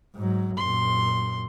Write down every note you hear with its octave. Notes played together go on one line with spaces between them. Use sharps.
G#2 F#3
F#2 A#2 C6